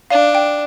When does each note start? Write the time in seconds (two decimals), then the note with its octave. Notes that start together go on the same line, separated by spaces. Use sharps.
0.10 D4 F5
0.35 G5